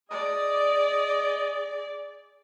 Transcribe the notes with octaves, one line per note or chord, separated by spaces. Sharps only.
G#4 D5 D#5